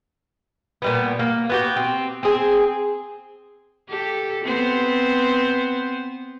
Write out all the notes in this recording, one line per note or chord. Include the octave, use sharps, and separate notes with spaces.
A#2 G3 B3
A#3
B3 F#4 G4
C4
C4 G#4
G4 A4
B3 C4 C5